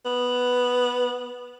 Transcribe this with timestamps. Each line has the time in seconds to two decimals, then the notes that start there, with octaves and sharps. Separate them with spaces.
0.05 B3